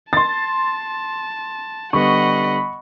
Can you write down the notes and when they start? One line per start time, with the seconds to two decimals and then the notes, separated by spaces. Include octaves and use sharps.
0.13 A5 C6 A6
1.93 D3 G3 B3 D#5 F#5 B5 C#6